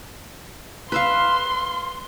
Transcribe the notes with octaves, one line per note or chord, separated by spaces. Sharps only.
B4 E5 F5 C6